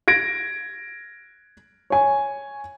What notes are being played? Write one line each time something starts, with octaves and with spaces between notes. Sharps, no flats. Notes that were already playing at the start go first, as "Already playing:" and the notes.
G#6 A#6 D7
C#5 G#5